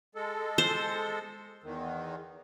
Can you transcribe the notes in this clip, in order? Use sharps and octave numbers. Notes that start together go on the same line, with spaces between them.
G#3 A4
C5
E2 D#3